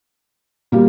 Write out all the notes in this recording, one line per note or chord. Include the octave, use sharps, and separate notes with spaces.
A#2 G3 A#3 F4